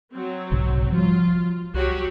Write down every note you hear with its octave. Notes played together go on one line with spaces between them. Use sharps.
F#3 C4
B1 G#2 C#3
F3 G3 F4
C2 F#3 F#4 G4